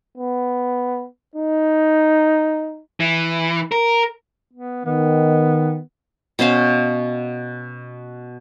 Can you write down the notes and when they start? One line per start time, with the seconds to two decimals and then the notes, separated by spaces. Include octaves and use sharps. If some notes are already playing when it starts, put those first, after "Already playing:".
0.17 B3
1.35 D#4
3.00 E3
3.72 A#4
4.53 B3
4.85 D#3 B3
6.39 B2 C#4 C5 F5